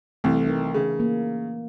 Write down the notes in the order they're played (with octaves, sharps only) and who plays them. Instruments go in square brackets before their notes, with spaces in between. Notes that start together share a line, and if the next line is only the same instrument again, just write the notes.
[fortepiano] C2 [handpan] E3 A3
[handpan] D#4 A#4
[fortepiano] C#3
[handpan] A#3